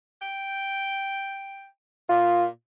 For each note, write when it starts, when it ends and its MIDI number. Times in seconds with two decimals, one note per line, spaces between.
0.22 1.66 79
2.09 2.47 46
2.09 2.47 65